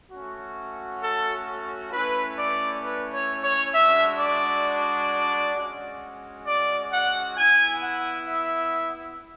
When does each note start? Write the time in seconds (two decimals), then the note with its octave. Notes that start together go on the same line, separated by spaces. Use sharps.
0.12 A3 C#4 F#4
1.02 A4
1.92 A3 C#4 E4 B4
2.38 D5
2.83 B4
3.13 C#5
3.44 C#5
3.74 G#3 D4 F#4 E5
4.19 D5
5.56 G#3 C#4 F#4
6.46 D5
6.92 F#5
7.37 B3 E4 G#5
7.82 F#5
8.28 E5